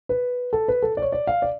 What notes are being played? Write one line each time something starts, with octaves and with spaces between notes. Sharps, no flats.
B4
A4
B4
A4
D5
C#5
D5
F5
D5